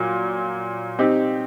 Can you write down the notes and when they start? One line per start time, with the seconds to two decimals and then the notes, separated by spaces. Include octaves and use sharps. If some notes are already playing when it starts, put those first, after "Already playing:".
Already playing: A#2 F#3
0.99 C4 D#4 G4